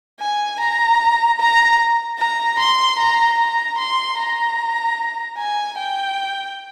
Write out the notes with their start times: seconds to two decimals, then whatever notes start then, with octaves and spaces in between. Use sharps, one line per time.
0.20 G#5
0.60 A#5
1.40 A#5
2.19 A#5
2.59 C6
2.99 A#5
3.39 A#5
3.78 C6
4.18 A#5
5.38 G#5
5.78 G5